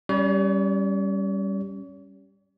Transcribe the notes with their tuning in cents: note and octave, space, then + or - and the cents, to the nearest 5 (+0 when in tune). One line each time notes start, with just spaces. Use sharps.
G3 +0 C#4 +0 C#5 +45